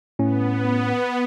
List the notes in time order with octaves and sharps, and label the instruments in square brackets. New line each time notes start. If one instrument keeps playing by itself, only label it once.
[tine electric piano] A2 C#4 [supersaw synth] B3